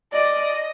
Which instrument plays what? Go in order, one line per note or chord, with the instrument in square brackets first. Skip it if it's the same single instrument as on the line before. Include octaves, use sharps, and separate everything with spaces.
[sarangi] D5 [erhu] D#5